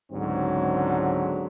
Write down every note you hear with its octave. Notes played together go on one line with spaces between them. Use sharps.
C#2 G#2 D3 F#3 C4